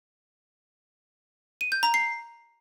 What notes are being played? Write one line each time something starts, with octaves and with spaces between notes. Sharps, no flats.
D#7
G6
A#5
C7